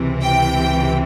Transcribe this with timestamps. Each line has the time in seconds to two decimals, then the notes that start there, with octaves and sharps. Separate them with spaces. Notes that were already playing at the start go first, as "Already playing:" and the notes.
Already playing: C#2 C3 E3
0.21 G5